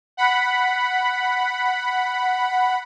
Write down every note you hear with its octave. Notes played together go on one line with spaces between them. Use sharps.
F#5 B5